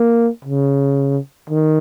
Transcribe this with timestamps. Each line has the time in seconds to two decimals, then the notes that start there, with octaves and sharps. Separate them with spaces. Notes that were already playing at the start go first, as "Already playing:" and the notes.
Already playing: A#3
0.44 C#3
1.50 D#3